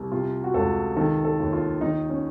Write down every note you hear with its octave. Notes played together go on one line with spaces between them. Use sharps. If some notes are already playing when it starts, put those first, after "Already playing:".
Already playing: C2
C3 F4
F#4
C#2 A4
D#3 A4
A4
D#2
F4
D#3 D#4
C#4